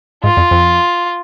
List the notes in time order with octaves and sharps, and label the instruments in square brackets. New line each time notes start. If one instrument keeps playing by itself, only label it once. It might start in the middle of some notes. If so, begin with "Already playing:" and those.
[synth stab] G#2 [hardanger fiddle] F4
[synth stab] F2
F2